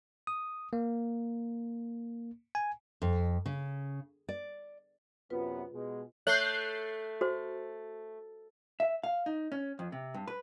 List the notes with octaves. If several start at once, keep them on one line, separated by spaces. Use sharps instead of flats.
D#6
A#3
G#5
F2
C#3
D5
F#2 C3 B3 F4 B4
B2 G#3
A3 C#5 F#6 G6 C7
F#4 C5
E5
F5
D#4
C#4
F2
C3
G2
B4